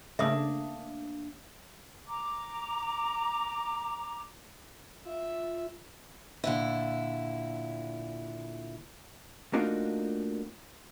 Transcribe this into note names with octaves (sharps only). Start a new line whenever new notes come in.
C#3 A3 A#3 D4 E5 D#6
A#5 D6
F4 E5
A#2 D3 E4
A3 A#3 D4 D#4 F4 F#4